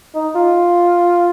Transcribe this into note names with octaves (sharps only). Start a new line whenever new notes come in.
D#4
F4